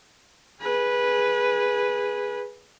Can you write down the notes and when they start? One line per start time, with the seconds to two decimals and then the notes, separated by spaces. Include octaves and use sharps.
0.61 G#4 B4